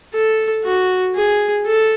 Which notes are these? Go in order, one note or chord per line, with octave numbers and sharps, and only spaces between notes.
A4
F#4
G#4
A4